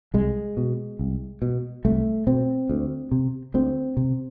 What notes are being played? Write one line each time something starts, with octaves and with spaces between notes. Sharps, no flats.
C2 G#3
B2
C2
B2
C2 A3
B2 C4
D2
C3
D2 C4
C3